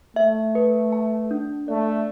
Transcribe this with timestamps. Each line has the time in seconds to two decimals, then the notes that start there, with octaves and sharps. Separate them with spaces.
0.16 A3 E5
0.55 B4
0.93 A5
1.31 D4
1.68 A3 D5